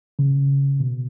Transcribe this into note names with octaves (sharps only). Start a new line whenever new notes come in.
C#3
B2